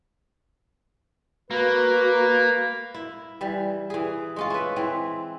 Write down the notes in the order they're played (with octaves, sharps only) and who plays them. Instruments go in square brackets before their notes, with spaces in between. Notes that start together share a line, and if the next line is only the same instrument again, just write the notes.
[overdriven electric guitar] A#3 [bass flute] F#4 [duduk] B4
[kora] E4
E3 G3
E3 G#4
G#3 C#4 F4
E4 B4
E3 C4